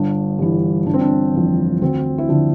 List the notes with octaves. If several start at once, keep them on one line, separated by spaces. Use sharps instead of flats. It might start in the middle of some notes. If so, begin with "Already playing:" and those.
Already playing: G1 D4
G2 E3
G1 D4
C4
D4
F2 E3
D2 C4
E4
D3 F3 D4